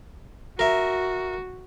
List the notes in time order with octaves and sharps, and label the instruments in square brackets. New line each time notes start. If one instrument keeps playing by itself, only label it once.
[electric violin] F#4 [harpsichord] A#4 E5